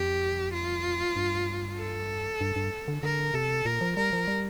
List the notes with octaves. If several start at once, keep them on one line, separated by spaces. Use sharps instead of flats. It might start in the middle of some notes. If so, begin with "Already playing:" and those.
Already playing: F2 G4
F4
G2
A4
G2
G2
D3
D3 A#4
C3 A4
A#2 A#4
F3
G3 A#4
F3
G3